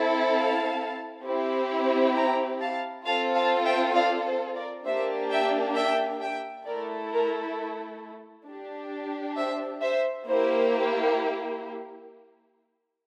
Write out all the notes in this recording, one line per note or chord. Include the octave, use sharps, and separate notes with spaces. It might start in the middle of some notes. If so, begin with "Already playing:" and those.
Already playing: C4 E4 A4
F5 A5
C4 E4 G4
G5 A#5
F5 A5
C4 F4 A4 F5 A5
F5 A5
E5 G5
D5 F5
C5
A#4 D5
A#3 D4 G4 C5 E5
E5 G5
E5 G5
E5 G5
A3 E4 A4 A#4 D5
A#4
D4
G4
C5 E5
C5 E5
A#3 E4 G4 C5